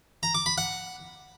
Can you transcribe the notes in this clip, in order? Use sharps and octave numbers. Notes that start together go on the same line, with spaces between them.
A#5
D6
B5
F#5